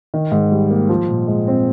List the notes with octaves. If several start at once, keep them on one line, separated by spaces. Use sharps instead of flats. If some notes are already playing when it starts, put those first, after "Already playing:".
D#3
G#2
G3
A#3
F3
A#2
G#3
C4